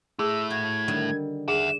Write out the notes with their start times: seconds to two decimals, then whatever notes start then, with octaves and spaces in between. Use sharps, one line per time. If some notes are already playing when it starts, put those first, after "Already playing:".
0.19 A3 E4 G#4 E6
0.50 F#4 G#6
0.88 D3 D#3 G3
1.48 G#4 E5 F#5 E7